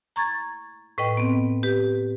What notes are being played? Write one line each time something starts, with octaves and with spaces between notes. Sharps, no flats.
A#5 C#6 G#6 A6
A2 B4 D#5 G5
B3 C4
G4 B4